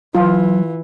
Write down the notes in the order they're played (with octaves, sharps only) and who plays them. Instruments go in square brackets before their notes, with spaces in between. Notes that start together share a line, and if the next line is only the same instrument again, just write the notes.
[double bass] E3 [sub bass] F#3 [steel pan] F4